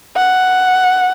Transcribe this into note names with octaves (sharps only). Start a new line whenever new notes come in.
F#5